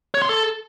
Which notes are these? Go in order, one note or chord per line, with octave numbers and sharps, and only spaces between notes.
C#5
C6
A4